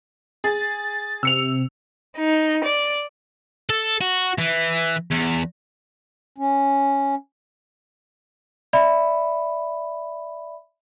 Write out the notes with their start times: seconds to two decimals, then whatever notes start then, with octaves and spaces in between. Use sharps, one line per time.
0.44 G#4 A6
1.23 C3 E6 C#7 F7
2.17 D#4
2.64 D5
3.70 A4
4.01 F#4
4.39 E3
5.11 E2
6.38 C#4
8.73 D5 E5 B5